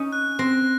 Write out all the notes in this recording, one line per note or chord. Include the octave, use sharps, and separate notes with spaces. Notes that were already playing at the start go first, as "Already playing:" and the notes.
Already playing: C#4 D#4
F#6
C4 A#6